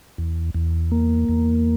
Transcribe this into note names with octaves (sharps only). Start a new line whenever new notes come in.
E2
E2
A#3
E2